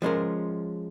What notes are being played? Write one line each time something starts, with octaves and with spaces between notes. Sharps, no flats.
F3 G#3 C#4 F4 A#4